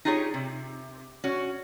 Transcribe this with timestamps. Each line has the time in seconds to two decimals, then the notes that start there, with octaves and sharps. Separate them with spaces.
0.05 D#4 F4 G4 G#4 C#5
0.34 C3
1.24 C#4 F#4